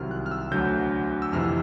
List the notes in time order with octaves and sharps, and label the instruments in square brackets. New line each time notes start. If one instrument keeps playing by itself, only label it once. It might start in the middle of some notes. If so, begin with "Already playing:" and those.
Already playing: [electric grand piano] C2 C3 D#3 F#3 F6
F#6
F6
E6
D2 D3 F#3 G6
E6
F2 C3 E3 F6